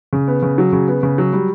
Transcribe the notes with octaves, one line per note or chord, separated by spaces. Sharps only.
C#3
B3
C#3
F#3
C#3
B3
C#3
F#3
G3